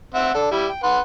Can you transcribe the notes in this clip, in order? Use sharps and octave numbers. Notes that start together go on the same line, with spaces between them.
C4 E5 F#5
D4 A4
G3 E4
G5
B4 F#5 C6